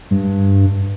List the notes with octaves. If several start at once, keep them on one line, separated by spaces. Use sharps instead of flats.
G2